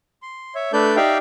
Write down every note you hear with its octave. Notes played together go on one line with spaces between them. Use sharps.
C6
C#5 E5
A3 D4 A4 B4 D5 G6
D#4 G4 D5 E5 F5 G5